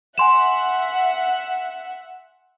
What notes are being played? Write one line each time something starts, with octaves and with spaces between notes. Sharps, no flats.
E5 F#5 G#5 C6 E7